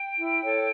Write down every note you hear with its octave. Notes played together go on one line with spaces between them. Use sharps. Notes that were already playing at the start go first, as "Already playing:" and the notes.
Already playing: G5
E4
A4 C#5